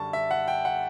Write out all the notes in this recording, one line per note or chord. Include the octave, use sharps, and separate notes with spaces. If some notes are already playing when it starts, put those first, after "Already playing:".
Already playing: F#2 D3 G3 A5 C#6
E5
F#5
G5
F#5